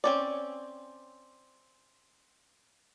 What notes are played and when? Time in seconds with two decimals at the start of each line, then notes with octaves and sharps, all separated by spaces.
0.04 C4 C#4 D5